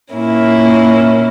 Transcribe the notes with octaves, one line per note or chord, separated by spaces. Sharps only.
A#2 A#3 C#4 E4